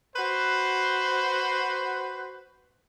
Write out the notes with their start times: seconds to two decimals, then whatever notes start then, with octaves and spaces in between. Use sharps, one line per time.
0.16 F#4 B4 C5